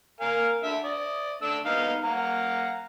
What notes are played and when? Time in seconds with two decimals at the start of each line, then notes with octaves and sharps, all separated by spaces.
0.20 A#4 F5 G#5
0.63 D3 E5
0.85 D5 D#6
1.42 A3 D4 E6
1.65 B3 D#4 F5
2.04 F5 F#5 A#5